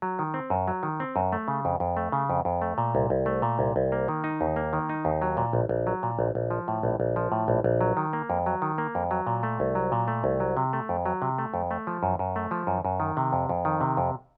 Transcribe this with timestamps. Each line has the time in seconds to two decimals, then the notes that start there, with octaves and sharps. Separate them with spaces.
0.02 F#3
0.19 D#3
0.34 C4
0.50 F#2
0.68 F#3
0.83 D#3
1.00 C4
1.16 F#2
1.32 A3
1.48 C#3
1.65 F2
1.80 F2
1.97 A3
2.12 C#3
2.30 F2
2.45 F2
2.62 A3
2.78 A#2
2.95 C2
3.10 C2
3.26 A3
3.42 A#2
3.59 C2
3.76 C2
3.92 A#3
4.08 D#3
4.24 D#4
4.41 D#2
4.56 A#3
4.73 D#3
4.89 D#4
5.05 D#2
5.22 F#3
5.37 A#2
5.53 A#1
5.69 A#1
5.87 F#3
6.03 A#2
6.19 A#1
6.35 A#1
6.51 F3
6.68 A2
6.83 A#1
7.00 A#1
7.16 F3
7.32 A2
7.48 A#1
7.64 A#1
7.81 F#3
7.97 D#3
8.13 A#3
8.30 F2
8.46 F#3
8.62 D#3
8.78 A#3
8.95 F2
9.11 F#3
9.27 A#2
9.43 A3
9.60 C2
9.75 F#3
9.92 A#2
10.08 A3
10.24 C2
10.40 F#3
10.57 C3
10.73 A3
10.89 F2
11.06 F#3
11.22 C3
11.39 A3
11.54 F2
11.71 A3
11.87 F3
12.03 F#2
12.19 F#2
12.36 A3
12.51 F3
12.67 F#2
12.85 F#2
13.00 D#3
13.17 C3
13.33 F2
13.49 F2
13.65 D#3
13.81 C3
13.97 F2